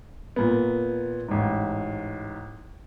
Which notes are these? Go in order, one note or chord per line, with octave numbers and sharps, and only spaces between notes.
A#2 B3
A1 G#2